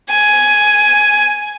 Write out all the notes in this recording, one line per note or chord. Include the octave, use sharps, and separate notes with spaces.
G#5